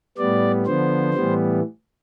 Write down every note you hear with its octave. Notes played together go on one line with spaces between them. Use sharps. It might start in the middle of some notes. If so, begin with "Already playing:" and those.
A2 G3 B3 D5
D3 F3 B3 C5
A2 E3 G3 B3